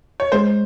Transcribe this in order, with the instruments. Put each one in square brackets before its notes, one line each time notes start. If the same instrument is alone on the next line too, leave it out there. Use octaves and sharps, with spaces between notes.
[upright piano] C#5
[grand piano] G#3 [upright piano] C5